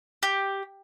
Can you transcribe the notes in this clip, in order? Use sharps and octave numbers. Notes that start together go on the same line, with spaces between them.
G4